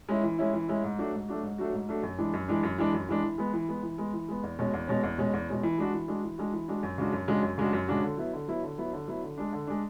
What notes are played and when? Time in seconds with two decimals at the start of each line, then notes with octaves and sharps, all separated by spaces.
0.09 G#3 C#4 E4
0.23 E3
0.38 G#3 C#4 E4
0.54 E3
0.68 G#3 C#4 E4
0.84 G#2
0.98 F#3 A3 D4 F#4
1.14 G#2
1.29 F#3 A3 D4 F#4
1.43 G#2
1.58 F#3 A3 D4 F#4
1.73 G#2
1.89 F#3 A3 D4 F#4
2.03 F#2
2.18 E3 G#3 D4
2.34 F#2
2.48 E3 G#3 D4
2.63 F#2
2.78 E3 G#3 D4
2.94 F#2
3.09 E3 G#3 D4
3.23 E3
3.38 G#3 B3
3.53 E3
3.68 G#3 B3
3.83 E3
3.98 G#3 B3
4.13 E3
4.28 G#3 B3
4.43 E2
4.59 B2 G#3 C#4
4.74 E2
4.88 B2 G#3 C#4
5.03 E2
5.18 B2 G#3 C#4
5.34 E2
5.48 B2 G#3 C#4
5.63 E3
5.78 G#3 D4 F#4
5.93 E3
6.08 G#3 D4 F#4
6.23 E3
6.38 G#3 D4 F#4
6.53 E3
6.68 G#3 D4 F#4
6.83 F#2
6.98 C#3 G#3 D4 F#4
7.13 F#2
7.28 C#3 G#3 D4 F#4
7.43 F#2
7.58 C#3 G#3 D4 F#4
7.73 F#2
7.88 C#3 G#3 D4 F#4
8.03 D3
8.17 F#3 B3 E4
8.33 D3
8.48 F#3 B3 E4
8.63 D3
8.78 F#3 B3 E4
8.93 D3
9.07 F#3 B3 E4
9.23 D3
9.37 G#3 D4
9.53 D3
9.67 G#3 D4